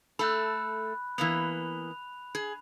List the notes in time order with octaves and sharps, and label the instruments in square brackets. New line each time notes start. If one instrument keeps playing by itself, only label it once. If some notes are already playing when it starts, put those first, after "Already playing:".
[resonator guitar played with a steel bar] A3 A4 [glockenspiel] B5 F#6
[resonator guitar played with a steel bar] E3 A#3 B3 [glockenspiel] F7
[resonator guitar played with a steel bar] G#4